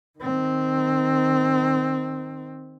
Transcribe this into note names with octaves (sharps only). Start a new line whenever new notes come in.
D#3 C4